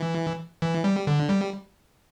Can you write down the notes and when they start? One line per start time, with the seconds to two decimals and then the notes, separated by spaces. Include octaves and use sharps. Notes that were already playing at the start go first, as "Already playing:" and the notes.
Already playing: E3
0.62 E3
0.84 G3
1.07 D3
1.29 G3